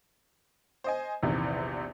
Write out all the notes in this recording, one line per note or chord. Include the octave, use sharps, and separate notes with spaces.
C5 D#5 G#5
A#1 E2 C3 D#3 E3